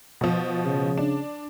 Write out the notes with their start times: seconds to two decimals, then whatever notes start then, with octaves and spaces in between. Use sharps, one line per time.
0.21 B2 F3
0.65 C#3
0.97 D4